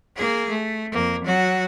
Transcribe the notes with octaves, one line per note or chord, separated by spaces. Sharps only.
A#3 G#4
A3
F2 A#3
F#3 F#4